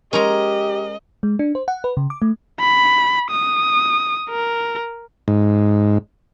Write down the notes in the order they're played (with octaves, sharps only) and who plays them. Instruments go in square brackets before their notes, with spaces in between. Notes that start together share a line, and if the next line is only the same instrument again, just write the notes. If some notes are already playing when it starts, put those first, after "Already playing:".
[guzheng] G#3 C#4 [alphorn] G4 [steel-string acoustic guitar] A#4 A#5 [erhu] D#5
[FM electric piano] G#3
D4
C5
F#5
B4
C#3
D6
A3
[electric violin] B5
D#6
A#4
[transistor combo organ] G#2